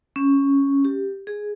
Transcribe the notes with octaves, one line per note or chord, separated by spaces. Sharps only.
C#4
G4
G#4